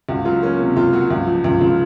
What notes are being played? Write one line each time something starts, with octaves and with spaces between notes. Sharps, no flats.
C#2 F#4
F#3 F4
A#3 C#4
C3
C#2 F4
F#3 F#4
C#2
F3
C#2
C#3 F4